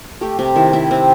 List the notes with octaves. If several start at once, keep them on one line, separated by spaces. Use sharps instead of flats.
A3 G4
C3 G4
D#3 E4
C3 E4
C3 C4